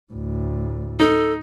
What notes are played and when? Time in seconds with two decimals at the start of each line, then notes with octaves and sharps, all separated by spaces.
0.13 D2 A2
1.00 D#4 A4